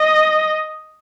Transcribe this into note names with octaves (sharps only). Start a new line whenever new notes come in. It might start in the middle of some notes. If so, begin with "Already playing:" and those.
Already playing: D#5